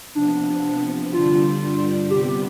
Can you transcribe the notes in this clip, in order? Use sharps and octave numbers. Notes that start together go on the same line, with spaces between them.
C3 F3 B3 D4
G2 D3 G3 D4 F4
C3 G3 B3 G4